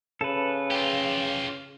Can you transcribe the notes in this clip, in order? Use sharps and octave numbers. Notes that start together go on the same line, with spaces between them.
C#3 A4 B4
F4 G4